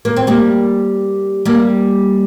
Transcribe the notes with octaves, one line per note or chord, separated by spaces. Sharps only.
A#3
C4
G3 A#3
G3 A#3